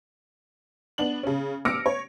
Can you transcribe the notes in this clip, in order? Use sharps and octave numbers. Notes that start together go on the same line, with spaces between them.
B3 D4 F#7
C#3 C#4
D6 E6 F6 A#6 C#7 D7
C#5